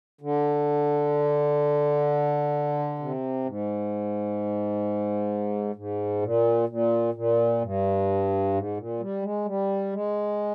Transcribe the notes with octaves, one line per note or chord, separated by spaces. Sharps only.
D3
C3
G#2
G#2
A#2
A#2
A#2
G2
G#2
A#2
G3
G#3
G3
G#3